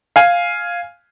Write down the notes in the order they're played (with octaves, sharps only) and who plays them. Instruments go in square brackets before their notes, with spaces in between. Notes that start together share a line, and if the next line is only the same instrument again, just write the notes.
[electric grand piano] F5 G#5